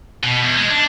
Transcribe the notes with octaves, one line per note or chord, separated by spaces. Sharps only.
B2
E2
G#3
D4